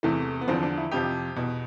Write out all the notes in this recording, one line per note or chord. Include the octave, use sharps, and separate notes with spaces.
E2 C3 E3 A3
B3
E2 D3 F3 C4
D4
E4
F2 C3 F3 G4
E2 B2